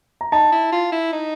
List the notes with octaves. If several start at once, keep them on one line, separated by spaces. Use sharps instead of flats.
A#5
D#4 A5
E4
F4
E4
D#4